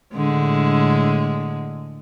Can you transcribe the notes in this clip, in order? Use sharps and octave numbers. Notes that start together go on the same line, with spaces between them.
A2 D3 G#3